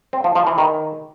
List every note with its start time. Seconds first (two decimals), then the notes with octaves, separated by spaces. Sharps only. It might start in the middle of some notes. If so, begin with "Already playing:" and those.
0.13 C4
0.24 F3
0.35 F3
0.47 E3
0.58 D#3